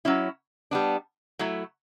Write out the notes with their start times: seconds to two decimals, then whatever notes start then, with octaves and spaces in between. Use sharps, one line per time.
0.05 F#3 C#4 E4
0.71 G3 B3 D4
1.39 F#3 A3 E4